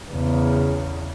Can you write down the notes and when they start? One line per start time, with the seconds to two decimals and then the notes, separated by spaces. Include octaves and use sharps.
0.11 E2 C#3